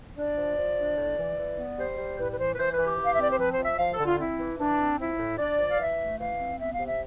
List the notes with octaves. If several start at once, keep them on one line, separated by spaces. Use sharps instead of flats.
D4 D5
F3
F3
D4
A2
E3
E3
B3
G3 C5
G3
A2 B4
B4
E3 C5
B4
E3 C5
B4
E3
G4
E3
F5
E5
C4 D5
C5
F3 B4
C5
F3
E5
F3 F5
A4
D3
F4
C4 E4
E3
E3 D4
C4
F3 E4
A2
D4 D5
F3
F5
E3 E5
A3
E3 F5
C4
B3 E5
F5
C3
E5